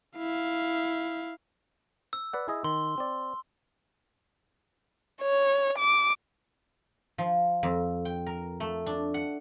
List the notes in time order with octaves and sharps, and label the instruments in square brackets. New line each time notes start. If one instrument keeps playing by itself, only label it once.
[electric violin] E4 F5
[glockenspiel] E6
[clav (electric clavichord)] B4 D5 F#5
E4 G#4 D#5
[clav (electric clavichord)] D#3 [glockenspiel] C6 G7
[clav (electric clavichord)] C4 D5
[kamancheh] C#5
D6
[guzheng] F3
F2
G5
A#4
A3
D4
F#5